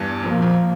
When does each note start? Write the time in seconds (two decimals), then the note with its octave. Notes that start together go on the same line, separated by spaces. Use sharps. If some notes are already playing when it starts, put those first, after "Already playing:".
Already playing: E2 G2
0.23 F2 A#2 F3 A#3
0.42 F2